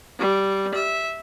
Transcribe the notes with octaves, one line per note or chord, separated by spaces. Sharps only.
G3
E5